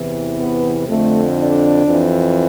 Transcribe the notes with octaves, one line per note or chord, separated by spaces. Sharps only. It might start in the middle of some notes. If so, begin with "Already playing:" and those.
Already playing: E2 C3 E3
B3
F2 D3 A3
D4
F2 E3